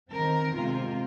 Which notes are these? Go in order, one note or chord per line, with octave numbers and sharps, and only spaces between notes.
D#3 C4 A#4
C3 G#3 C4 F4